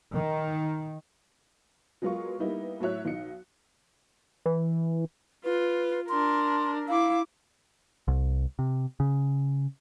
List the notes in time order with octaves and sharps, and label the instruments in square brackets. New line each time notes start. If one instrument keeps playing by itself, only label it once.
[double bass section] D#3
[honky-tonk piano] F#3 G#3 B3 F4 A#4 C#6
G3 A#3 B3 D#4 E4
A2 F#3 F#4 C#5 E5 F#6
B1 D#4 C#7
[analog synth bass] E3
[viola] F4 [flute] B4
[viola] D4 A#4 [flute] C6
[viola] E4 D6 [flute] F5
[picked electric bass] C2
C3
C#3